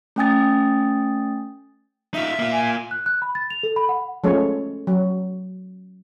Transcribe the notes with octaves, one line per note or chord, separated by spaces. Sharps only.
A3 C#4 G5 G#5 D#6 A6
D#4 F4 E5
A#3 F4
G#5
F#6
F#6
B5
A6
F7
A4
B5
F#5
F3 G#3 A3 C#4 A4 C#5
F#3